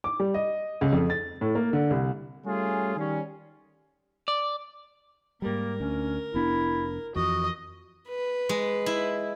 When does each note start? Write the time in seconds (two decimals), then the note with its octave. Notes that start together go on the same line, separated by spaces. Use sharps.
0.04 D6
0.20 G3
0.34 D#5
0.81 C#2
0.93 F2
1.10 A6
1.41 A2
1.55 A#3
1.73 D3
1.90 C2
2.45 G3 A3 C#4 F4 G#4
2.97 D#3 G3 C#4
4.28 D5
5.42 G#2 G3 A#3 A#4
5.80 D2 C#4
6.34 F1 B3 D4 E4
7.15 F2 E3 F#4 D#5
8.09 B4
8.49 G#3
8.86 E4